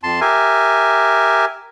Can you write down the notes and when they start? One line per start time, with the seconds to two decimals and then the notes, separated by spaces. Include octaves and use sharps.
0.03 F2 A5 C6
0.21 G4 A#4 E5 G#5